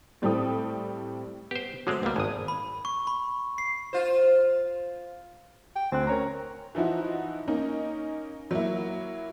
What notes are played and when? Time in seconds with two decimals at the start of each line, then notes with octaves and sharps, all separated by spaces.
0.22 A2 G3 C4 A4 G5 D#6
1.51 B3 G4 C5
1.87 D3 F#3 G#3 A3 C4 C5
2.03 C#2 G3 A#3 B3
2.16 G#1 G2 G#5 D#6
2.48 B5
2.85 C#6
3.07 B5
3.58 C7
3.93 F4 C5
5.76 G5
5.92 D2 C4 F#6
6.07 C#4 A#4 C#5 A#5
6.75 E3 F3 D#4 E4 F#4
7.48 A#3 C#4 D#4
8.51 F#3 A#3 E4